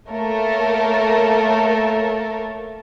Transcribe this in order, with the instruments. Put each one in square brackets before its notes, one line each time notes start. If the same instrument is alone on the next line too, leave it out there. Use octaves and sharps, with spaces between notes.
[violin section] A3 A#3 A4 A#4 C#5